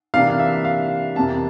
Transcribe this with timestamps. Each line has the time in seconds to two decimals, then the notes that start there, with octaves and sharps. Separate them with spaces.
0.14 C3 E3 A#3 D4 F5
0.29 F5
0.39 E5
0.65 F5
1.16 F2 C3 E3 A#3 A5